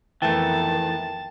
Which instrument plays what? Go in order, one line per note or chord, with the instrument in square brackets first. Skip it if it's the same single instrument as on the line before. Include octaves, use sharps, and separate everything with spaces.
[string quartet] F2 D#3 B3 [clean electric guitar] E3 A3 [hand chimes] G5 [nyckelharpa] A5